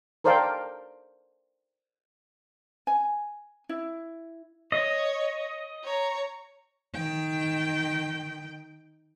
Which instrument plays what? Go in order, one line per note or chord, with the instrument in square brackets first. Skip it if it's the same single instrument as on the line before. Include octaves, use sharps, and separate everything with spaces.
[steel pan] A4 A#4 C5 D5 F5 G5
[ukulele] G#5
E4
[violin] C#5 [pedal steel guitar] D#5
[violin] C#5 A#5
[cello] D#3 G5